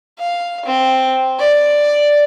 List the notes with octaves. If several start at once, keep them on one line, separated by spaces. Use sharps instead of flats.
F5
C4
D5